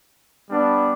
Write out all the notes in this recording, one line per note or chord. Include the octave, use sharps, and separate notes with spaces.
G3 B3 D4